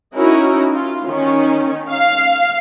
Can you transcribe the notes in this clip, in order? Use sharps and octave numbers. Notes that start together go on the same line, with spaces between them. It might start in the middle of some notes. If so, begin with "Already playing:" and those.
C#4 D#4 E4 F#4 A#4
F4
D#3 C#4
F5